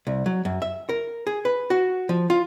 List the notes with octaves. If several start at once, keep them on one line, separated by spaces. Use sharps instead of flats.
C2
F#3
F#2
E5
A#4
G#4
B4
F#4
F3
F4